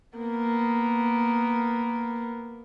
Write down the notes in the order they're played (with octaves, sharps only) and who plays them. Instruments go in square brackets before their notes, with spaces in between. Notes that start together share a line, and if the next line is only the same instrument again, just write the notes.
[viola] A#3 B3